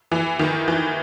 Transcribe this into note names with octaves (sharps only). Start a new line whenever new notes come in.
E3
D#3
E3